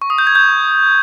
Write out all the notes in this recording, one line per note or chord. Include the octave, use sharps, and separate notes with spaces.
C#6
D#6
G6
G#6
G6